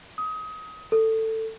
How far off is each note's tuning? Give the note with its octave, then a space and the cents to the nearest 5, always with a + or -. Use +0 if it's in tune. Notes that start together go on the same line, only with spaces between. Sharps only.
D#6 +25
A4 +15